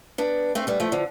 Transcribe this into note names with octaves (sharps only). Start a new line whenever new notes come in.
B3 D4
A3 C4
G3 B3
F3 A3
D3 F3